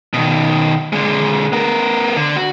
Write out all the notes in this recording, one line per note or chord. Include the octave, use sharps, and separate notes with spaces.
B2 D#3
D3 G#3
B3 A#4
D3
F#4